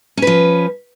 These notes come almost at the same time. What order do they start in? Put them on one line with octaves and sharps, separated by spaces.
C#4 B4 F3